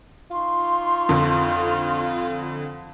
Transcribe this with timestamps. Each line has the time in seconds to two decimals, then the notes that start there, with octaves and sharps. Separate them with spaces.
0.31 D#4 F4 C6 C#6
1.09 F2 D3